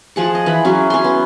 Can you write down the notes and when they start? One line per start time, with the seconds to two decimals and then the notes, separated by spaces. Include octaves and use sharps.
0.16 F3 G#4 F#5
0.35 D#5
0.46 E3 B5
0.64 E3 F#3 C#4 G#4
0.90 C#4 C6
1.04 B3